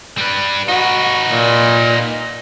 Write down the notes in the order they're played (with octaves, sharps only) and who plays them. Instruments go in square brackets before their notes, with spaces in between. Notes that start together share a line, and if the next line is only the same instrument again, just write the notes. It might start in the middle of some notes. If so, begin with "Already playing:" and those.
[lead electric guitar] G3 B4
[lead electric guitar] D#4 B4 [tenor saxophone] F#4
[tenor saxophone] A#2